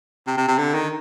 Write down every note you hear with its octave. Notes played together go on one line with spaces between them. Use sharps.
C3
C3
C3
D3
D#3